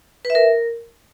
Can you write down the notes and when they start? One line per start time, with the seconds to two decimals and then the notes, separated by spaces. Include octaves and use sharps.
0.25 B4
0.30 E5
0.35 A#4